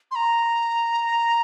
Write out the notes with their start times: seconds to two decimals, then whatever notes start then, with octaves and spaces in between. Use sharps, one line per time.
0.11 C6
0.15 A#5